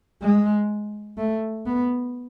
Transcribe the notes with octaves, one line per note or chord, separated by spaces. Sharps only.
G#3
A3
B3